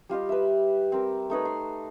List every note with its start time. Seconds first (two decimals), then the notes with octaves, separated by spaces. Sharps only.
0.09 G3 F4 G4 D#5
0.29 B4 E5
0.92 C4 A#4
1.30 A3 D#4 B4 C#5
1.45 C6